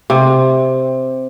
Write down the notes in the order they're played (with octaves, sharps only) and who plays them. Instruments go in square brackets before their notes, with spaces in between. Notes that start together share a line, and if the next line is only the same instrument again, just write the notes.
[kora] C3